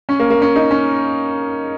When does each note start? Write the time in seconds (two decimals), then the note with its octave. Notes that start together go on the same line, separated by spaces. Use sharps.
0.09 C#4
0.20 A#3
0.30 A#3
0.42 C#4
0.56 D#4
0.71 C#4